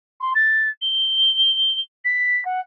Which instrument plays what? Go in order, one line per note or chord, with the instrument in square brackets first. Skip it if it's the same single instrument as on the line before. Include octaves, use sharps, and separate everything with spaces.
[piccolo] C6
A6
G7
B6
F#5